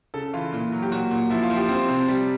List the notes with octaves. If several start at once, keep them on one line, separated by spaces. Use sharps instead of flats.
C#3 A4
E3 F4
A#2
F#3
G4
A#2 F#4
A#2
F3 E4
F4
F3
G4
C4
C3
G3